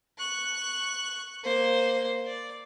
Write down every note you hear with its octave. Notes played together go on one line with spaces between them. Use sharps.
C#6 F#6
A#3 C5
D5